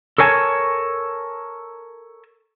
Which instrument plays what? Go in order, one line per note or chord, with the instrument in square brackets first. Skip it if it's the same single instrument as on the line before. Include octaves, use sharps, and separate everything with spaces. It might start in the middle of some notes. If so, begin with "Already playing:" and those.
[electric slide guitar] A4 A#4 C#5 G#5 A5